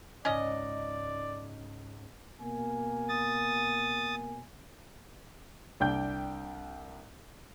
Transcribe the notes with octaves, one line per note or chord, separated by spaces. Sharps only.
C#2 G#2 C#4 D5 D#5
B2 A#3 G#5
D#6 A6
C2 D4 G5 G6